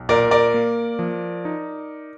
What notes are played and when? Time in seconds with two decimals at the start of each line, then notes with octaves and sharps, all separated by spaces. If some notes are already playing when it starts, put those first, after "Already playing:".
Already playing: B1
0.09 A#2 A#4 D5
0.31 A#4 D5
0.54 A#3
0.99 F3
1.45 D#4